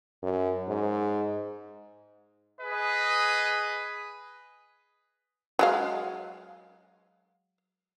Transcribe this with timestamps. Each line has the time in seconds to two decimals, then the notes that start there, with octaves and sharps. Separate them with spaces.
0.23 F#2
0.68 G#2
2.61 G#4 B4 D#5
5.59 F#3 G#3 F5